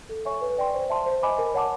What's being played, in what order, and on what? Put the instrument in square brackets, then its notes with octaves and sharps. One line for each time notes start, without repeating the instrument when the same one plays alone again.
[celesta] A4
C#5 E5 G#5 C#6
B4
D5 G5 C6
C5
E5 A5 C6
C5
D#5 G#5 B5 D6
A#4
C#5 F#5 A5 D6